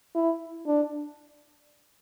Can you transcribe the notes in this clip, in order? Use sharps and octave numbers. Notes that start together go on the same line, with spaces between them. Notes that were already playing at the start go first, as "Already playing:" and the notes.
E4
D4